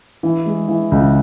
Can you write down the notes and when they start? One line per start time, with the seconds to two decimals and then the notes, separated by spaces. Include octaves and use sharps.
0.23 E3
0.46 G#3
0.68 E3
0.92 C#2